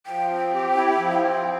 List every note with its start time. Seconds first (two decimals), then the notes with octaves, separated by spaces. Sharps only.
0.06 F3 G5
0.30 C4
0.54 G4
0.76 E4
0.99 F3
1.22 C4